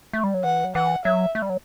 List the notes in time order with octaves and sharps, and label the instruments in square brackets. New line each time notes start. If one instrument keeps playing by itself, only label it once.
[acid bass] A3
G3
F#3
[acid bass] E3 [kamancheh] F#5
[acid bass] F#3
[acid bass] E3 [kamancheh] F#5
[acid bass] F#3 [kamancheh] E5
[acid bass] A3
G3
F#3